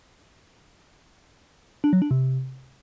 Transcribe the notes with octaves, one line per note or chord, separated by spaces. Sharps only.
D4
F#3
D4
C3